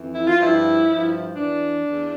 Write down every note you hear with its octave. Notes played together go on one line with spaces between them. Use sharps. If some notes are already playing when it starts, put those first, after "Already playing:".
Already playing: F2 E3
E4
F4
G2 F3 E4
G2 F3
E2 E3 D4
E2 E3